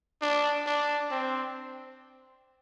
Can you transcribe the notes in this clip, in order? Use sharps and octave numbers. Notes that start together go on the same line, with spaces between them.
D4
D4
C4